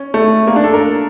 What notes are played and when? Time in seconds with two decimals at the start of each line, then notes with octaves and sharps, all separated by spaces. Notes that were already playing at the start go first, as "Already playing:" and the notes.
Already playing: C#4
0.14 A3
0.47 A#3
0.56 D4
0.64 A4
0.73 A#4